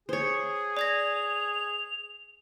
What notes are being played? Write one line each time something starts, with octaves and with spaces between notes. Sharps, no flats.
G#4 C5 C#5
D5 G#6 A#6 F7